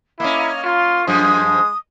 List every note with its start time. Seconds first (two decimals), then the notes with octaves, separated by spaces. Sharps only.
0.20 A#3 C#4 E4 D#5
0.64 F4 C6
1.07 F#2 F3 G#3 D#6